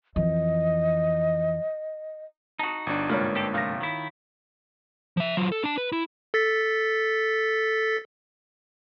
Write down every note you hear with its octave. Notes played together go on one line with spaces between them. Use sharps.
F2 E3 D#5
D#4 F#4 A5 D#6
G1 D4
C2 G#2 F#3 G3 A#3 F4 B4 C#5
C4 G4 A4
C3 F3 A3 F5 A#6
D#3 E4
F3 E5
F#3 F4
A4
D4 A5
B4
E4
A4 A6 B6